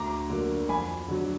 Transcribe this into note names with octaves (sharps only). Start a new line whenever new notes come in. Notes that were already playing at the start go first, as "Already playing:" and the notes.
Already playing: D2 A#5 D6
D3 F#3 A#3
F2 G#5 B5
D3 F#3